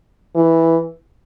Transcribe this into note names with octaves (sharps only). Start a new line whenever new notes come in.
E3